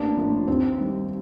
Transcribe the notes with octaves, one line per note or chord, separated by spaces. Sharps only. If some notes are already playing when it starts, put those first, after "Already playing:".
Already playing: A1 A#3 D4
A2 F3 A#3
D#2 C4
D#3 G3